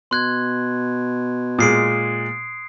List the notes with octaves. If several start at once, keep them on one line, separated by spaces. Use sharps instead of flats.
B2 C6 F#6 G#6
A#2 G#3 D#6 C7 D7